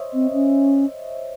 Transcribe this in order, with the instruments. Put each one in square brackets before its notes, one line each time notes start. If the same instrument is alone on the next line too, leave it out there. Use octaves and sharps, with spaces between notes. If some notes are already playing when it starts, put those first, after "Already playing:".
Already playing: [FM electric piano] C5 C#5 D#5 E5
[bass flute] C4
C#4